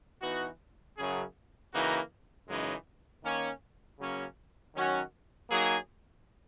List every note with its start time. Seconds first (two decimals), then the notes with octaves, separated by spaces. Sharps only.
0.21 E3 B3 D#4 F#4
0.97 F#2 C#3 F#3 C#4 G#4
1.72 C#3 E3 A#3 D#4 F#4
2.48 F#2 C#3 E3 G#3 D#4
3.23 D#3 A#3 C#4
3.99 C#3 F#3 A#3 C#4
4.75 D#3 F#3 C#4 F#4
5.50 F#3 A#3 D#4 G#4